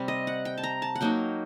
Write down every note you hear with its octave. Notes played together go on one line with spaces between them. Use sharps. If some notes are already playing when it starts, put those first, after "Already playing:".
Already playing: C3 G3 C4
D#5
F#5
G5
A5
A#5
A5
F#5
F#3 A#3 D#4 G5